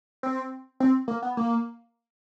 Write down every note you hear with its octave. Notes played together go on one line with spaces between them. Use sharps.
C4
C4
A#3
B3
A#3